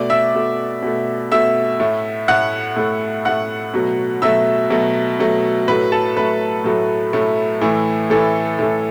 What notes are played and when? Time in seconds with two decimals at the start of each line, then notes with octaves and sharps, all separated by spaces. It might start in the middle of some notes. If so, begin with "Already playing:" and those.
Already playing: B2 A3 D5 D6
0.10 E5 E6
0.34 B2 A3
0.83 B2 A3
1.32 B2 A3 E5 E6
1.80 A2 A3
2.28 A2 A3 F#5 F#6
2.76 A2 A3
3.25 A2 A3 F#5 F#6
3.74 B2 F#3 A3
4.22 B2 F#3 A3 E5 E6
4.70 B2 F#3 A3
5.19 B2 F#3 A3
5.68 A2 F#3 A3 B4 B5
5.92 A4 A5
6.16 A2 F#3 A3 B4
6.64 A2 F#3 A3
7.13 A2 F#3 A3
7.61 A2 E3 A3
8.10 A2 E3 A3 A4
8.59 A2 E3 A3